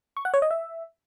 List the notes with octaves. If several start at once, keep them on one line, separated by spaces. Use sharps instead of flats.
C#6
F#5
C#5
D#5
E5